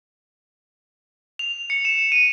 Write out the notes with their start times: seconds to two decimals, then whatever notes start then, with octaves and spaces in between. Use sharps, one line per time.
1.39 F7
1.70 C#7
1.85 E7
2.12 D#7